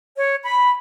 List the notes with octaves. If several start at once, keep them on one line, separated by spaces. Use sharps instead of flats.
C#5
B5